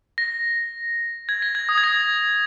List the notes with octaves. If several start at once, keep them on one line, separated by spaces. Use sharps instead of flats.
A#6
G#6
A#6
G#6
D#6
G#6
A#6